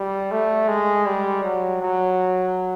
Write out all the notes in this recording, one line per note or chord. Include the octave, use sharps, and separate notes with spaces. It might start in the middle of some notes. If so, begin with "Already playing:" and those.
Already playing: G3
A3
G#3
G3
F#3
F#3